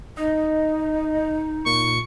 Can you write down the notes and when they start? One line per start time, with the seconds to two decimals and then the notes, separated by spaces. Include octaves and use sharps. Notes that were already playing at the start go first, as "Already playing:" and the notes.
0.17 D#4 D#5
1.66 A#2 C#6